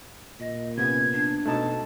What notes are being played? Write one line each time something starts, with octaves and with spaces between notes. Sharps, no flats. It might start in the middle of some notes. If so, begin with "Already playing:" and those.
A#2 D#5
C3 B3 C#4 G#6
D4
B2 A3 D#4 A4 A5